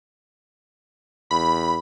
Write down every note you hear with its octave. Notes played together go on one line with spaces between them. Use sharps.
E2 B5